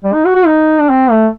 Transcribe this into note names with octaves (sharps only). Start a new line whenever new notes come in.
G3
D#4
F#4
F#4
D#4
D4
C4
A3